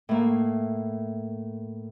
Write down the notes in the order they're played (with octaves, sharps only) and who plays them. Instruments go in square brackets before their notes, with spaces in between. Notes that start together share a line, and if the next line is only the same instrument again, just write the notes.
[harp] A2 A#3